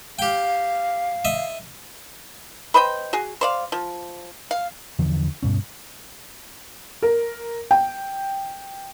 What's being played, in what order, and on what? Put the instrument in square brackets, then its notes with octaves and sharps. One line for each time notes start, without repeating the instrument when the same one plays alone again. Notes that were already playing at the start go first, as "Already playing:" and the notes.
[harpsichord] G4 G5 [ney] F5
[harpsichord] D#5 E5
[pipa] B4 C5 D#5 G5
F#4 G#4
C5 D5 F5
F3
F5
[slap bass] E2 D3 E3 F3
D2 G2 B2 C#4
[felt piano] A#4
G5